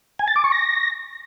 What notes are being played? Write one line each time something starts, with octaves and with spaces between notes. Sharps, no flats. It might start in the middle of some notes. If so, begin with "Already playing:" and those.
G#5
A6
D6
C#6
A#6